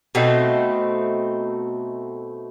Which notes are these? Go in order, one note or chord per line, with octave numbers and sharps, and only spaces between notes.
B2 A3 C4 D#4